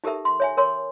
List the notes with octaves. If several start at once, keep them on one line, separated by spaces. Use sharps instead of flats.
D#4 G4 A4 A#4 E5
C6
C#5 E5 G#5
A#4 C#5 C6